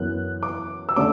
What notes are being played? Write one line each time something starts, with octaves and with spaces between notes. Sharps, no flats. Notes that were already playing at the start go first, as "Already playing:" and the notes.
Already playing: F#2 E3 B3 F#6
D6
E6
D3 A3 C#4 D6